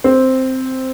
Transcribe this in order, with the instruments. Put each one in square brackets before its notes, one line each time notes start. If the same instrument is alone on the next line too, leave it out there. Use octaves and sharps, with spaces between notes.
[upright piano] C4